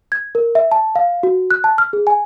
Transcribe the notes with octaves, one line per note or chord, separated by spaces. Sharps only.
G#6
A#4
E5
A5
F5
F#4
F#6
A5
F6
G#4
G#5